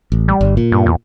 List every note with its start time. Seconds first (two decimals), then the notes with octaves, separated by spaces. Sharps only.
0.12 A1
0.28 G3
0.41 G1
0.57 A#2
0.72 G2
0.86 E2